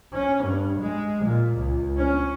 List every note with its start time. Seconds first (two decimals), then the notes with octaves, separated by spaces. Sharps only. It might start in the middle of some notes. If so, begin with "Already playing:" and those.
0.13 C#4
0.45 G2
0.80 G#3
1.25 A#2
1.57 C#2
1.97 C#4